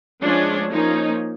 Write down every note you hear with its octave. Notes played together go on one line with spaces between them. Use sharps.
F3 G#3 C#4 D4
F3 A#3 C#4 D#4